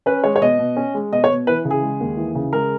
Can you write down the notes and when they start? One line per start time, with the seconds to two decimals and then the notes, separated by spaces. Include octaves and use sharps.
0.06 C#4 B4
0.24 G#3 C#5
0.36 C#5
0.42 B2 D#5
0.59 B2
0.77 C#4
0.94 G#3
1.12 B2 D#5
1.24 C#5
1.30 B2
1.47 E3 B4
1.65 C#3
1.71 G#4
1.82 G#3
2.00 D#2
2.17 E3
2.35 C#3
2.53 G#3 A#4